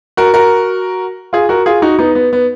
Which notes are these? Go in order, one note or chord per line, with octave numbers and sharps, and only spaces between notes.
F#4 A#4
F#4 A#4
F4 G#4
F#4 A#4
F4 G#4
D#4 F#4
B3 D#4
B3
B3